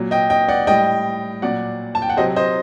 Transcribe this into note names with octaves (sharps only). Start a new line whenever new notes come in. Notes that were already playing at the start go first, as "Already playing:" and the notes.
Already playing: A#2 F#3
D#5 G5
D#5 G5
D5 F#5
A2 G3 D#5 G5
A#2 F#3 D5 F#5
A5
G5
F#5
C3 F#3 C5 D#5
C5 D#5